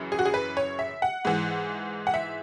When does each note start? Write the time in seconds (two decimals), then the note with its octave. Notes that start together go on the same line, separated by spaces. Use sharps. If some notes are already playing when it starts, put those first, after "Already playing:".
Already playing: F#2 C#3 E3
0.12 G#4
0.19 F#4
0.25 G#4
0.34 B4
0.57 C#5
0.79 E5
1.02 F#5
1.25 G#2 E3
2.07 F#5
2.14 E5